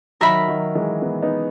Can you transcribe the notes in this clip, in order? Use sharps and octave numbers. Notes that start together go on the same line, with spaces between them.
D#3 F#3 A#4 E5 B5
D#3 F#3
E3 G#3
G#3 B3
B3 D#4